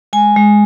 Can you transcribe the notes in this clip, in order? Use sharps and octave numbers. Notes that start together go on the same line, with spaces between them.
G#3 G#5
G#3